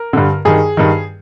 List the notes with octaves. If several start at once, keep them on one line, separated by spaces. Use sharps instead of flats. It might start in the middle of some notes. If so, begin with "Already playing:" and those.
Already playing: A#4
G2 D3
G2 D#3 G#4
G2 D#3